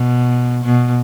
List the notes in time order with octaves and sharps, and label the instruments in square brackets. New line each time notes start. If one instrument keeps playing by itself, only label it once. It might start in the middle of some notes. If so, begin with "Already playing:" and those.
Already playing: [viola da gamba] B2
B2